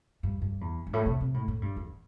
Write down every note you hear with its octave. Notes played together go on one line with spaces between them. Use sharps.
G2
G2
E2
G2
A2
C3
C3
A2
A2
G2
E2